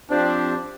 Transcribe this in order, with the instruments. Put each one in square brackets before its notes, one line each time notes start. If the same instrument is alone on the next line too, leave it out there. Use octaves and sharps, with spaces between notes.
[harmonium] F3 C4 G4 C5 [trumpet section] D4